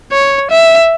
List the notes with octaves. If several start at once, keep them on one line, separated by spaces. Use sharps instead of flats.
C#5
E5